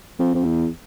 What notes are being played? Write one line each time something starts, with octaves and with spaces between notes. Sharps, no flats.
F2
F2
E2